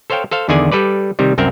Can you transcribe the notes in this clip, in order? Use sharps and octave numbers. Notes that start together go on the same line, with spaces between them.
A4 C5 C#5 F5 G5
A4 C5 F5
E2 D3 D#3 G#4 D5 G#5
G3 A4 B4 D5
C3 D#3 G3
C2 F#2 C4 A#4 E5